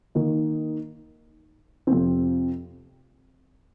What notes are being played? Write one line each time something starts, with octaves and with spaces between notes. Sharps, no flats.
D#3 A#3 D#4
F2 C3 F3 C4